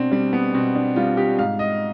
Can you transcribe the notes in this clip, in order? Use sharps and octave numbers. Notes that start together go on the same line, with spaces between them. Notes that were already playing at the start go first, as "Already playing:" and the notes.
Already playing: B2 C4 D4
G3 C4
B3
B2 C4
D4
G3 F4
G4
G#2 F5
D#5